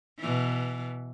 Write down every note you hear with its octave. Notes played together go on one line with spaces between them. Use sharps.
B2 E3